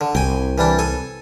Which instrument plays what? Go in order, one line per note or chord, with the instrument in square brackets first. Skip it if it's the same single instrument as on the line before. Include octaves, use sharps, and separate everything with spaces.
[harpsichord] D3
[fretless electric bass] C2 [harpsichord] G5 G#5
[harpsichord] E3 G3 D4
A4 G#5